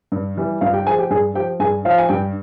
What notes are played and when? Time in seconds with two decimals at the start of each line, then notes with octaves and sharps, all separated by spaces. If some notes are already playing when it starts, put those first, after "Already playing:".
0.12 G2
0.37 E3 G3
0.61 G2 F4 F5
0.73 G4 G5
0.87 F3 G#4 G#5
0.98 G4 G5
1.10 G2 G#4 G#5
1.35 F3 G4 G5
1.60 G2 G#4 G#5
1.85 F3 F4 F5
1.98 G#5
2.09 G2 G4 G5